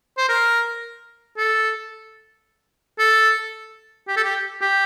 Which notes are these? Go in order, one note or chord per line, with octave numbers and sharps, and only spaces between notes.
C5
A#4
A4
A4
G4
A4
G4
G4